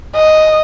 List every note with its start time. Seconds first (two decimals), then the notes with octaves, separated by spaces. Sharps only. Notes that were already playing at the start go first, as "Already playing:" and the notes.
0.16 D#5